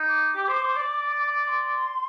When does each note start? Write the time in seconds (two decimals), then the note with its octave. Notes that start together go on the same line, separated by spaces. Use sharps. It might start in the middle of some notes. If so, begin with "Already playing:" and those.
Already playing: D#4
0.09 D6
0.36 G4
0.48 C5
0.63 C5
0.76 D5
1.44 D6
1.48 C6